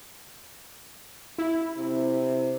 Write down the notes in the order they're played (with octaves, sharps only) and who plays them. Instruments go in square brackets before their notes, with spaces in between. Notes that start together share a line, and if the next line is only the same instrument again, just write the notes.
[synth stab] E4
[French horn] C3